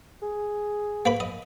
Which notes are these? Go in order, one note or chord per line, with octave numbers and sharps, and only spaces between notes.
G#4
A#3 B4 B5
D#5